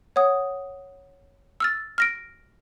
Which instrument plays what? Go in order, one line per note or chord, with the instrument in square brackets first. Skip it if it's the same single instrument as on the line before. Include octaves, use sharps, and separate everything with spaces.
[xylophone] C#5 F#5 D#6
E6 F6 A6
F6 A#6 D7